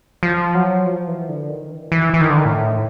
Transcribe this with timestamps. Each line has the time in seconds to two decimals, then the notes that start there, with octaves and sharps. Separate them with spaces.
0.23 F3
0.55 F#3
0.86 F3
1.08 E3
1.29 D3
1.49 D#3
1.71 E3
1.92 E3
2.14 E3
2.21 D#3
2.30 D3
2.38 D#3
2.45 A2